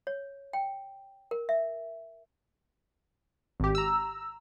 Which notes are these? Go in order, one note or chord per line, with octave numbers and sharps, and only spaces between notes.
C#5
G5
A#4
E5
G#1 G4
A#5 E6